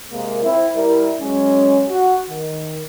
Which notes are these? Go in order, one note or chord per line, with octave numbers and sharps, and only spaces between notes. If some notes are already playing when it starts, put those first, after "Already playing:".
C3 G#3 A#3
C4 E4
G3 E4 A#4
F#3 G#3 C#4
F#4
D#3